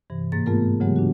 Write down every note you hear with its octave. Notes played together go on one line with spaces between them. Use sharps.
G2 C3 E3
G#2 A#3 A6
A3 B3 F4 G#4 A#4
C#3 E3 F#3 G#3 B3 G4
D4 F#4